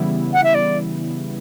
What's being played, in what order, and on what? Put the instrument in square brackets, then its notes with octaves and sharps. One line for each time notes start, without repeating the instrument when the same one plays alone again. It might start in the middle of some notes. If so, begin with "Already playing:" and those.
Already playing: [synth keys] C#3 E3 G3 B3 E4
[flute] F#5
E5
D5